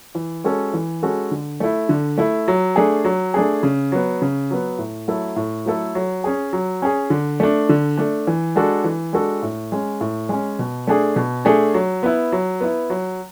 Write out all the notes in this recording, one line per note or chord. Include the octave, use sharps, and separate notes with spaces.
E3
G#3 C#4 F#4 A4
E3
G#3 C#4 F#4 A4
D3
A3 E4
D3
A3 E4
F#3
A3 D4 G#4
F#3
A3 D4 G#4
C#3
F#3 B3
C#3
F#3 B3
A2
F#3 A3 E4 A4
A2
F#3 A3 E4 A4
F#3
C#4 G#4
F#3
C#4 G#4
D3
A3 D4
D3
A3 D4
E3
G#3 D4 F#4 A4
E3
G#3 D4 F#4 A4
A2
G#3 C#4
A2
G#3 C#4
B2
A3 D4 G#4
B2
A3 D4 G#4
F#3
B3 E4
F#3
B3 E4
F#3